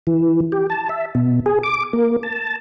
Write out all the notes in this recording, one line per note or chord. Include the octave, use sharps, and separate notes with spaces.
E3
G4
A5
E5
B2
G#4
D6
A#3
A5